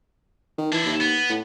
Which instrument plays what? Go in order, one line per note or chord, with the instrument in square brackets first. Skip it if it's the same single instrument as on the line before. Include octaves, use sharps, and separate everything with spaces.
[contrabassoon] D#3
[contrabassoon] E3 [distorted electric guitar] D4 E4
[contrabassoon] D#2
[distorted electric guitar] B3
[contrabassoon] A2